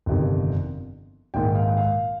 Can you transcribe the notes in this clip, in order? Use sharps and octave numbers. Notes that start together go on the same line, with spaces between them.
G1 F2 C3 D#3
A#1 G#2 D#3 G5
F5
F5